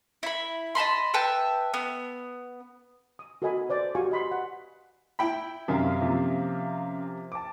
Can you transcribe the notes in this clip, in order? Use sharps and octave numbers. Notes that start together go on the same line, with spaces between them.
E4 B5
D#5 A5 B5 C6
B4 E5 G5 A5
B3
D#6
F#4 A4 A#4 D#5 G#5 B5
B4 C5 D5
F#4 G4 F5 G#5 C#6
D#5 B5 C6
F#5
E4 G5 B5
F#2 C3 D#3 C#4 E5 F5
C3 F3 A#3
A5 D6